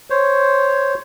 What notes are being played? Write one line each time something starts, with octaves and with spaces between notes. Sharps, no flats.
C5 C#5